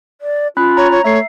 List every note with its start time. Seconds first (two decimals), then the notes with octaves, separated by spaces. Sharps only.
0.21 D5
0.57 C#4 F4 B5 F#6
0.77 C#5 A#5
0.91 C#5
1.04 A3 C#5 E5 C7